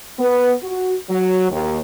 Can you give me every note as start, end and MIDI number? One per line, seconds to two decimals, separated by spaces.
0.19 0.52 59
0.62 0.93 66
1.10 1.46 54
1.50 1.78 39